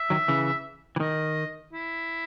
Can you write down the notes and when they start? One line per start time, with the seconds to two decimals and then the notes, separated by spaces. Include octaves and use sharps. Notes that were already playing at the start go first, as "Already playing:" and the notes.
Already playing: E5
0.10 D#3 F#3
0.28 C#3 E3
0.96 E3
1.00 D#3 D#5
1.73 E4